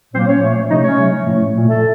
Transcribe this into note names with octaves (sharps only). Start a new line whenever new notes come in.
A#2 F#3 A#3 C4 C5
C#4 C#5
A#2 F3 A3
C3 F3 A3 D#4 D#5
C#4 C#5
C3 F#3 A3
A2 F3 A3
A#2 A3
A3 A4